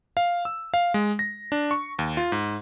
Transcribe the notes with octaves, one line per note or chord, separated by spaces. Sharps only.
F5
E6
F5
G#3
A#6
D4
C#6
D#2
F4
G#2